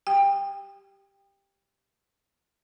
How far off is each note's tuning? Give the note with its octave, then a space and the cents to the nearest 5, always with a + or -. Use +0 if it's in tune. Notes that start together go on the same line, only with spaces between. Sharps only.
G4 +0 G5 +20